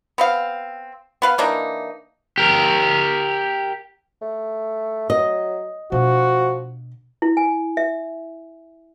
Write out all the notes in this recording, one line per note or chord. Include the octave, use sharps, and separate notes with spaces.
B3 C4 F5
B3 B4 F5
E3 A#3 D4 D#4
G4 A#4
A3
F#3 D#5
B2 F3 D4 F#4
E4
G#5
E5